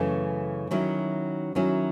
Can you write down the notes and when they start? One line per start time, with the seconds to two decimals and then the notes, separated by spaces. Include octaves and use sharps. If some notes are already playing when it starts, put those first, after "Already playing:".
Already playing: F#2 C#3 E3 A3 C#4
0.71 D#3 F#3 C#4 E4
1.55 D#3 F#3 C#4 E4